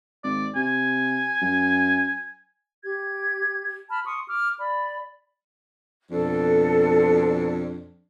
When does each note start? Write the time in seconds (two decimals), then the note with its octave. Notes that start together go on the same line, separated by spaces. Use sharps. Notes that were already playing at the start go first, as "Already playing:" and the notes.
0.24 G#1 D5
0.56 C3 G#5
1.41 F#2
2.84 G4 G#6
3.90 A5 B5 F6
4.05 C6 C#6 D#6
4.28 D6 F6
4.58 D5 B5
6.11 F2 B2 D4 A4